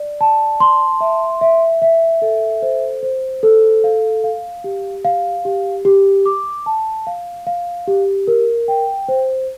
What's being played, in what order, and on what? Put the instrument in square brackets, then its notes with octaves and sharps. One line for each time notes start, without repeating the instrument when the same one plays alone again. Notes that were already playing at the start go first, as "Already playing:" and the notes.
Already playing: [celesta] D5
A5
C6
E5
E5
E5
A4
C5
C5
A4
F5
F5
G4
F5
G4
G4
D6
A5
F5
F5
G4
A#4
G5
C5